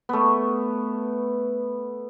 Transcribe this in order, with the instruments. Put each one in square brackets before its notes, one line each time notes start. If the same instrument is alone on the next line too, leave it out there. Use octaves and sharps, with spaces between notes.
[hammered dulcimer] A3 B3